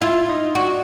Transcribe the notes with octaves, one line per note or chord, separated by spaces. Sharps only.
E4 F4
D#4
D4 F#4